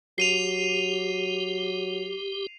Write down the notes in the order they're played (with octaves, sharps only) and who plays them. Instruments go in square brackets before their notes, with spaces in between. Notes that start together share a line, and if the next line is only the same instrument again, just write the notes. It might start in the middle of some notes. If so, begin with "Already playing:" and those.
[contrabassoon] F#3 [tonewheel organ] G4 [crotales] C7 D#7 F7